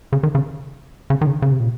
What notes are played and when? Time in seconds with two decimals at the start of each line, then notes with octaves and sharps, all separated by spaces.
0.13 C#3
0.23 D#3
0.35 C#3
1.10 C#3
1.21 D#3
1.27 C#3
1.42 C#3
1.52 C3
1.60 A#2